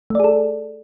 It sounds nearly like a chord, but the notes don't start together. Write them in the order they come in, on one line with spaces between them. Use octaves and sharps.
A3 D5 G#4 A4